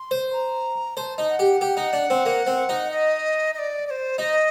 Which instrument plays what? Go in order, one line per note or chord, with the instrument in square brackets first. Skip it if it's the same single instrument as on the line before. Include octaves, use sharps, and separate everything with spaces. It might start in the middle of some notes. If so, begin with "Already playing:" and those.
Already playing: [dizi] C6
[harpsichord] C5
[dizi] A#5
[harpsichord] C5 [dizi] A5
[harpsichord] D#4
[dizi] F#5
[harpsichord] G4
G4
D#4
D4
C4
A#3
C4
D#4
[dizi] D#5
D#5
D5
D5
C5
[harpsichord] D#4 [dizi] D#5